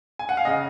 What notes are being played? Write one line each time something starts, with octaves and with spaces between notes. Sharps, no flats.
G#5
F#5
F5
C#3 D#5